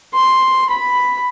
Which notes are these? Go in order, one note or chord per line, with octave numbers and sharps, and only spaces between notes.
C6
B5